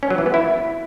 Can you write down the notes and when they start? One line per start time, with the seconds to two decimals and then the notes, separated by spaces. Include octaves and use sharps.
0.03 C#4
0.10 F#3
0.18 E3
0.26 B3
0.34 E4